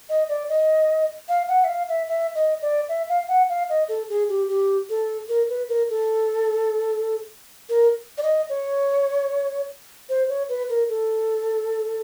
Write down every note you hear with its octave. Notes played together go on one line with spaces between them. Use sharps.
D#5
D5
D#5
F5
F#5
E5
F5
E5
E5
D#5
D5
E5
F5
F#5
F5
D#5
A4
G#4
G4
G4
A4
A#4
B4
A#4
A4
A#4
D5
D#5
C#5
C5
C#5
B4
A#4
A4